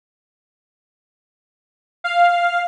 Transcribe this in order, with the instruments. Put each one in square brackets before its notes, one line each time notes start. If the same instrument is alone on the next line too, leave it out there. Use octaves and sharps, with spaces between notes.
[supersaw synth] F5